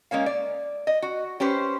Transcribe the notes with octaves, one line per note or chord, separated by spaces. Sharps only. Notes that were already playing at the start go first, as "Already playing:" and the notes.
G#3 A#3 C#4 F5
D5
D#5
F#4
C#4 G4 B4 C5